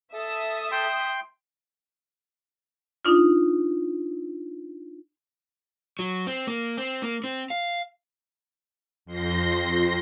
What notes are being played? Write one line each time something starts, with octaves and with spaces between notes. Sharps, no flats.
A4 E5 A5 D#6
G5 C6
D4 D#4 F4
F#3
C4
A#3
C4
A#3
C4
F5
F2 C6 A#6